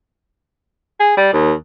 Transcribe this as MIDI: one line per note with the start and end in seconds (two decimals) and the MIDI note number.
1.00 1.14 68
1.17 1.31 55
1.33 1.53 39